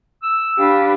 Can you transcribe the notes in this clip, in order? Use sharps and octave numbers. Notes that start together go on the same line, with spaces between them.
E6
D4 G4 B4 F5